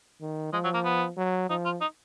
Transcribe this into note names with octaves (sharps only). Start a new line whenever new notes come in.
D#3
F3 G#3
F#3
A#3
B3
F#3
F3 D#4
F4
D#4